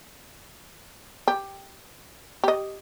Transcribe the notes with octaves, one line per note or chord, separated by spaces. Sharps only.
G4
G4 D#5